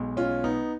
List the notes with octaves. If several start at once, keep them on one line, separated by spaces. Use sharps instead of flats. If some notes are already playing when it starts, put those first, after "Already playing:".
Already playing: B1 B2 G#3
C#4 F4
B3 D#4